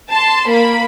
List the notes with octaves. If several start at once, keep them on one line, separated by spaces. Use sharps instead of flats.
A5 C6
A#3 B5